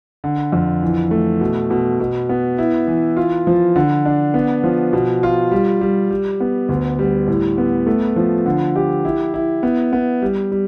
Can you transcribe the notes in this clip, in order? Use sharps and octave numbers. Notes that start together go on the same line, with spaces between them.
D3
F2
E3
A3
B2
B2
B2
B3
E4
E3
F4
F3
D3
D4
B3
F3
B2
F4
G3
G3
G3
B3
D2
G3
A2
B3
A3
F3
D3
G4
E4
E4
B3
B3
G3
G3